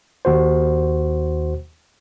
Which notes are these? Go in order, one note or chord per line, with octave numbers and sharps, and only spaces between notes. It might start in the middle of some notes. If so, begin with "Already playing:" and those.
D#2 F#4 C5